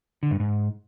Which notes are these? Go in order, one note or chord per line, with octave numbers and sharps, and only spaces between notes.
D3
G2
G#2